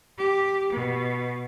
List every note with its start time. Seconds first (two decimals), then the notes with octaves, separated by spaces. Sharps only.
0.17 G4
0.71 B2